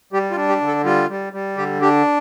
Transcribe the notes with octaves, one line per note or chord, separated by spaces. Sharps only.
G3 G4
F4
D4
G4
D3
A4
G3 F4
G3
G3
D3 G4
D4 G4